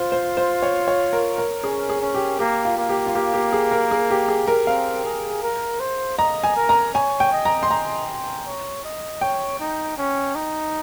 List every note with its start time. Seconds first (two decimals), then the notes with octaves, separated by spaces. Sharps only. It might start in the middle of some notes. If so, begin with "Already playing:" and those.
Already playing: F4 C5
0.12 C5
0.37 C5
0.63 C#5
0.88 C#5
1.13 A#4
1.38 A#4
1.63 C#4 G#4
1.89 G#4
2.01 C#4
2.15 G4
2.39 A#3 G4
2.65 F4
2.77 A#3
2.89 G4
3.06 F4
3.15 A#3 G4
3.34 G4
3.53 G#4
3.71 A#4
3.91 G#4
4.11 G4
4.28 G#4
4.48 A#4
4.67 C4 F5
5.05 G#4
5.43 A#4
5.80 C5
6.18 D#5 A#5
6.44 G#5
6.56 A#4
6.69 A#5
6.94 C#5 G#5
7.20 G5
7.32 D#5
7.45 A#5
7.63 C6
7.70 D#5 A#5
8.46 C#5
8.84 D#5
9.21 C#5 G5
9.59 D#4
9.98 C#4
10.35 D#4